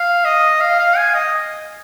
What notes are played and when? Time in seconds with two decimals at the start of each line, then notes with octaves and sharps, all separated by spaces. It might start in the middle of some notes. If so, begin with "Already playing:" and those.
Already playing: F5
0.25 D#5
0.61 F5
0.79 F5
0.97 G#5
1.14 D#5